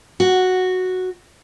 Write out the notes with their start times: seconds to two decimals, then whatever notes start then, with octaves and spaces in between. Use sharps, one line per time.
0.20 F#4